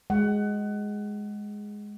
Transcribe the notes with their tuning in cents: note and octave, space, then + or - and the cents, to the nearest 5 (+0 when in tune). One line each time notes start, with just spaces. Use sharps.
G#3 +0 F#5 +25